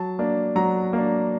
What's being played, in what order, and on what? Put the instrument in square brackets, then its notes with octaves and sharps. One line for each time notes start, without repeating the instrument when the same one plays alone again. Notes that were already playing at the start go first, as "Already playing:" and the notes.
Already playing: [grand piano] F#3 A5
A#3 D4
F#3 A#5
A#3 D4